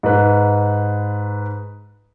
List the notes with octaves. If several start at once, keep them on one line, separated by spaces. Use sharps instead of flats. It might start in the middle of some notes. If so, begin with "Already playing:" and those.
G#2 B4